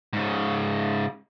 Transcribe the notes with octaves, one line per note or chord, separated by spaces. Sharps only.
G#2 C#3